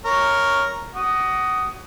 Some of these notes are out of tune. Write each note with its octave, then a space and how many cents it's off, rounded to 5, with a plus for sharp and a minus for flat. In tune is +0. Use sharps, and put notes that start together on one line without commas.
A#4 +0 C#5 +0
F#4 +20 D#6 +0